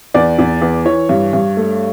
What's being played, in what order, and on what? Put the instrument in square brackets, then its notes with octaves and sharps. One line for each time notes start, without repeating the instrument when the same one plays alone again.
[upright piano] E2 D5
E2
E2
E3 C#5
G2
G2
A3